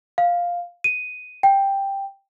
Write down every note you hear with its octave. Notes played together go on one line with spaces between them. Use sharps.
F5
D#7
G5